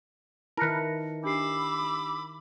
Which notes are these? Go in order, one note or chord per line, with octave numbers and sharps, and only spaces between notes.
D#3 E4 A#4 B4 A5 A#6 C#7
D4 G4 B5 D6 E6 C7